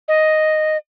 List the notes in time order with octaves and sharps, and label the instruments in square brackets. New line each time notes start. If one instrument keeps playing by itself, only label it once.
[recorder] D#5